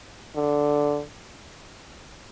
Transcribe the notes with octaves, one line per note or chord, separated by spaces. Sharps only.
D3